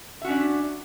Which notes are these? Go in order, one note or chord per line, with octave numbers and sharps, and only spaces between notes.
C#4 D4 F#4 E5